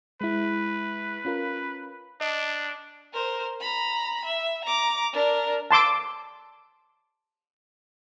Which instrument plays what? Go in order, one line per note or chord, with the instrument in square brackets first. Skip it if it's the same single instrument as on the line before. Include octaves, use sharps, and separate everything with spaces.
[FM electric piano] G#3 E4 [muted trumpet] B4
[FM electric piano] C#4 F4 A#4
[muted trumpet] D4 [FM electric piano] D#5
[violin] A#4 C5
A#5 B5
E5
A#5 D6
D4 A#4
[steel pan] A5 C6 D6 E6